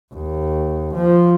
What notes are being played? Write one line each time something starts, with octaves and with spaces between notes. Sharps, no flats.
D#2
F3